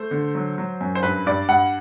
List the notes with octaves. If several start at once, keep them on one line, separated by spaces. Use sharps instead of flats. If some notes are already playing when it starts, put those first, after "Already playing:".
Already playing: A3 C5
D3
F#3
F#3
F#2
C5
G2 B4
G2 D5
G2 F#5